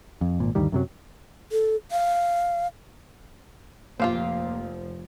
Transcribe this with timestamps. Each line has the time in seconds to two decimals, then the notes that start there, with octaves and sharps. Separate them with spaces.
0.21 F2
0.40 G#1 A#2
0.55 D2 G2 D#3 G3
0.72 F#2 C3 F#3
1.52 A4
1.91 F5
4.00 F1 A#2 F3 A#3 F4 G4 C5 F5